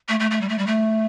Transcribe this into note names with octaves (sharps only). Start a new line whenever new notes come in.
A3
A3
A3
G3
A3
G3
A3